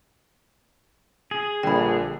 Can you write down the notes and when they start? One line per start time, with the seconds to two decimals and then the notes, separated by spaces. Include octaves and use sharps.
1.31 G#4
1.63 A#1 D3 G3 G5 B5